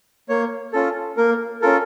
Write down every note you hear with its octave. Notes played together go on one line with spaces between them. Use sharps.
A#3 C#5
C#4 F4 A4
A#3 A#4
C#4 F4 A4 A#4